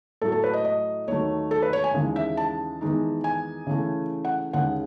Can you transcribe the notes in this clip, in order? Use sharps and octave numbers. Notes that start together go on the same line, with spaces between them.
A2 F#3 A3 A4
A4
B4
D#5
D#5
D#2 D#3 F#3 A3 C#5
A4
B4
C#5
G#5
D#2 C#3 E3 G#3
E5
A5
E2 D#3 G#3 D#4
G#5
C#3 E3 A3
F#5
D#2 C#3 G#3 F#5